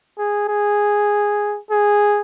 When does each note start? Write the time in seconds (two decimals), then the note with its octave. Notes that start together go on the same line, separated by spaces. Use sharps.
0.18 G#4
0.49 G#4
1.71 G#4